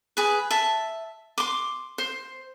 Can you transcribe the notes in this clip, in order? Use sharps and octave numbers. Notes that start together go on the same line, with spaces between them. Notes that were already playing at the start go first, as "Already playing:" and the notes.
G#4 B4
E5 A5
C6 D6
C5